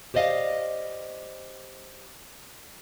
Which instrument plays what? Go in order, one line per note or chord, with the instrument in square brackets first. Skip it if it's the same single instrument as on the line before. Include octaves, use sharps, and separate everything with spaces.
[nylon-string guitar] G4 C5 D5 D#5 F5